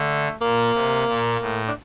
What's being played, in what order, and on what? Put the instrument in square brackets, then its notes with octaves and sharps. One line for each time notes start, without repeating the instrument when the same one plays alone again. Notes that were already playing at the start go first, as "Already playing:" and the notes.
Already playing: [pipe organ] D3 [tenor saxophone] A3
[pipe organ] A#2 [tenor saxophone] A#3
[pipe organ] C3
A#2
A2
[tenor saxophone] D4